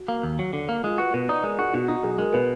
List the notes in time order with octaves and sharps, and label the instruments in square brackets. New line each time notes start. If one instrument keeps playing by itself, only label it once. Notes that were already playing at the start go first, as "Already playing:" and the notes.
Already playing: [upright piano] F#4
[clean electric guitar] A#3
D#2
F#3
D3
A#3
[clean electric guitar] G#3 [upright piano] F4
[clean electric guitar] F#4 [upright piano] B4
[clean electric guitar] B2 [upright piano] B4
[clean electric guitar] D#4 [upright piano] D5
[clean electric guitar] G#3 [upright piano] A#4
[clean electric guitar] F#4 [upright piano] G#4
[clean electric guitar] B2 [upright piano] F#4
[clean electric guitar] D#4 [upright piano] F#4
[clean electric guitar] B1 [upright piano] G#4
[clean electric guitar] G#3 [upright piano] A#4
[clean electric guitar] B2 [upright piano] B4